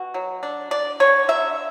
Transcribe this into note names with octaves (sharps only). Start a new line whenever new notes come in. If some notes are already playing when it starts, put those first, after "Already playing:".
Already playing: B2 F#4
F#3
D4
D4 D5
D3 C#5
F#3 E5